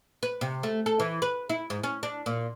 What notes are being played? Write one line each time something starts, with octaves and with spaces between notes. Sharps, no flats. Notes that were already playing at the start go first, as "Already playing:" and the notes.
B4
C3
A3
A4
E3
B4
E4
G#2
C#4
D4
A#2